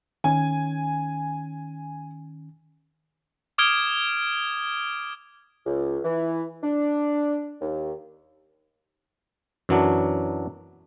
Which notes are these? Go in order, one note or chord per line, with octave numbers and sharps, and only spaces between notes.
D#3 C#4 G#5
D6 D#6 F6 G#6 D7 G7
C#2
E3
D4
D#2
F#2 E3 F#3 D4